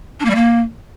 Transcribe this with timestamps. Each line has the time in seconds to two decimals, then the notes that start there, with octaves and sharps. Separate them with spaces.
0.20 D4
0.25 A#3
0.30 G3
0.35 A#3